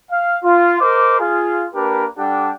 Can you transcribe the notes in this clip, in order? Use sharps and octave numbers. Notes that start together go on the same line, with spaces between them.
F5
F4
A#4 C5 D#5 D6
F4 G#4
A#3 D4 G4 A#4 B4
G3 D4 G4 A4 F#5 G5